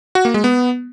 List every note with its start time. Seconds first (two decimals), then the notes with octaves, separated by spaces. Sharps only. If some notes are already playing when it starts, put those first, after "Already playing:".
0.15 F#4
0.25 A#3
0.34 G#3
0.44 B3